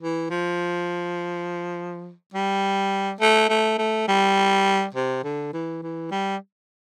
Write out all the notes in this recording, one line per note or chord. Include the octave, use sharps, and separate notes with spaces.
E3
F3
G3
A3
A3
A3
G3
C3
D3
E3
E3
G3